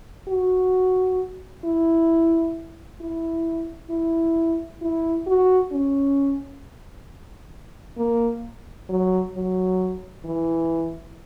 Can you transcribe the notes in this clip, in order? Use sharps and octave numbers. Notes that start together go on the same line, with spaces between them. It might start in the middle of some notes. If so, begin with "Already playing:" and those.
F#4
E4
E4
E4
E4
F#4
C#4
A#3
F#3
F#3
E3